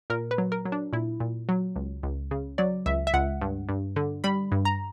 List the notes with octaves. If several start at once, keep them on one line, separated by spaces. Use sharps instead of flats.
A#2 A#4
B4
F#3
A#4
F#3
D4
A#2 E4
A#2
F#3
C#2
C#2
C#3
F#3 D5
C#2 E5
E5
C#2 F#5
G2
G2
D3
G3 B5
G2
A#5